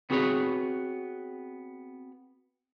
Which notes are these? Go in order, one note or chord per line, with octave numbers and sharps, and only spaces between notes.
B3 C4 F#4 G#4 B4 C#5